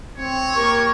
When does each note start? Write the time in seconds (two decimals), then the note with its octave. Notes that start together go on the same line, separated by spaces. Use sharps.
0.18 C4 C#5
0.54 A#3 G4 A#4 C#6